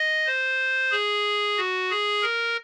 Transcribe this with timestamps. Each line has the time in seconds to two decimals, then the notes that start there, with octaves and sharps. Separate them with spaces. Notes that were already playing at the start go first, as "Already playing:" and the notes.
Already playing: D#5
0.26 C5
0.91 G#4
1.57 F#4
1.90 G#4
2.23 A#4